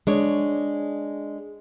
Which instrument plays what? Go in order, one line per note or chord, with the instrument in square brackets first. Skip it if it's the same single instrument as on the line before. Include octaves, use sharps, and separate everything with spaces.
[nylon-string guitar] G#3 D4 C#5